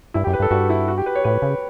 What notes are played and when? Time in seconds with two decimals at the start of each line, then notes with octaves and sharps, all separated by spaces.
0.14 G2 E4
0.24 G4
0.27 F#2
0.33 B4
0.40 G2
0.42 A4
0.51 G2 F#4
0.70 E4
0.88 F#4
0.98 G4
1.06 B4
1.15 C#5
1.24 A2 B4
1.42 C#3